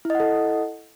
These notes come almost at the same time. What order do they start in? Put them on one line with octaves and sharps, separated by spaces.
E4 D#5 F#5 A4